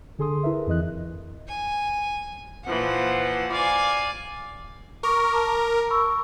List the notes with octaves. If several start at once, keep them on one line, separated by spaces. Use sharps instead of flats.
D3 G#4 A4 C6 D#6
E4 A#4 B4 E5
F2 E3 D#5 F#6
G#5
A#2 E3 F3 F#5
D5 F5 G#5
A#4 C#6 D6
A5 A#5 D6
B5 C#6 E6